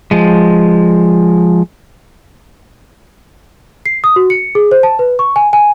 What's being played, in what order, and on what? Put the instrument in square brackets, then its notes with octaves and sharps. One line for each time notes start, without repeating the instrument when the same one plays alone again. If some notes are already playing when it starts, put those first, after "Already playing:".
[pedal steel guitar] F3 G#3
[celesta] C7
D#6
F#4
C#7
G#4
C5
A5
B4
C#6
G#5
G#5